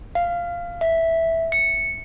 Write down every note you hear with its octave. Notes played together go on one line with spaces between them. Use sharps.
F5
E5
C#7